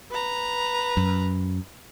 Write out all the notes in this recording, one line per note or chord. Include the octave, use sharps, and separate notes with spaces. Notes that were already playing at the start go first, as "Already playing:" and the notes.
B4 A#5
F#2